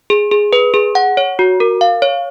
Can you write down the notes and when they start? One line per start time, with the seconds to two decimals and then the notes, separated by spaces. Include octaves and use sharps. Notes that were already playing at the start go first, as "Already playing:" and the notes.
0.10 G#4
0.31 G#4
0.53 B4
0.74 G#4
0.95 F#5
1.17 C#5
1.39 F#4
1.60 A#4
1.81 F5
2.02 C#5